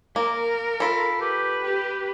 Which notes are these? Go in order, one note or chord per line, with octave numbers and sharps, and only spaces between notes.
A#3 A#4
F4 A4 B5
G4 B4
G4 G5